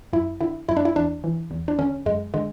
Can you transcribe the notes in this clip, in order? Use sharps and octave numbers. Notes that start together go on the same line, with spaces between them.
F#2 E4
D3 E4
F#2 E4
D4
E4
E2 D4
E3
E2
D4
D3 C#4
F#2 G#3
D3 G#3